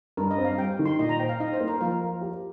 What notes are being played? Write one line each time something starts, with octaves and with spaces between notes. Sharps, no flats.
G2 A#4
D#5
C4
F5
G3 G5
D#3
C6
A#2 D#5
A#5
C5 G5
F5
D#4 D#5
C5
A#3
A#4
F3 F4
A#4
G4